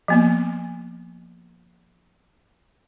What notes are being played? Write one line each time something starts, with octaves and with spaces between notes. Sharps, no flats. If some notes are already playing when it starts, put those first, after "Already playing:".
F3 A#3 B3